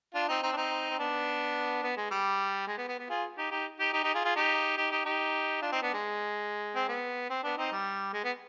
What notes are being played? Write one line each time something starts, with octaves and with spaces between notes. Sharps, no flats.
D4 F4
C4 D#4
C4 D#4
D4
C4 D#4
C4
B3 D4
B3
G#3
G3
G#3
B3
B3
B3
F4 G#4
D#4 G4
D#4 G4
D#4 G4
D#4 G4
D#4 G4
F4 G#4
F4 G#4
D#4 G4
D#4 G4
D#4 G4
D#4 G4
D4 F4
C4 D#4
B3 D4
G#3
C4
B3
C4
B3 D4
C4 D#4
G3
G#3
B3